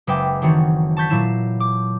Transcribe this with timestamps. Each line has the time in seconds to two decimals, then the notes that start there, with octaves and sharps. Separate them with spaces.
0.07 F#1 G#3 B4 E5 G5 D6
0.42 D#3 E3 A3 C4 F#4 C#5
0.97 A5 C#6 G6 B6
1.10 A#2 F#3 E4 C7 E7
1.60 D6